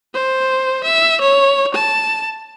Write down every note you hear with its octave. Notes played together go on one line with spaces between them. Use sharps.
C5
E5
C#5
A5